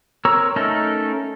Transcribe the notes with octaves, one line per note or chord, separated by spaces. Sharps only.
C4 A#4 C#5 A#5 E6
A3 C#4 D#4 A4 A#4